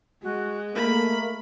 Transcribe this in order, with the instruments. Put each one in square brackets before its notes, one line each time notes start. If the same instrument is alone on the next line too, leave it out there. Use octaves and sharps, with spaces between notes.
[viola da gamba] G#3 [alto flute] F#4
[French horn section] A3 A#3 [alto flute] A#4 [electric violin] B5